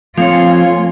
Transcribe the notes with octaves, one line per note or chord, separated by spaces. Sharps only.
F3 A3 C4 F4 C#5 F5 G#5